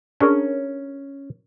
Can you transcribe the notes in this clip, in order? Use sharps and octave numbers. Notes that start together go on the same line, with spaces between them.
C#4 D4 G#4 A#4